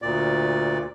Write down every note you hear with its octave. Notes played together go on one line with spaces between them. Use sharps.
D2 A#2 D5